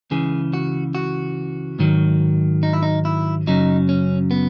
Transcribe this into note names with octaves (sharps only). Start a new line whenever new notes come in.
C#2 C#3 E3 G#4
F#4
F#4
G#2 D#3 F#3
D#4
E4
D#4
E4
F#2 C#3 F#3 D#4
C#4
B3